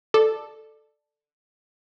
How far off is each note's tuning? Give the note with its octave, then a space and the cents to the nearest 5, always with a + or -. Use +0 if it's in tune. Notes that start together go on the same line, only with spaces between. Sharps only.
A4 +0 D5 +20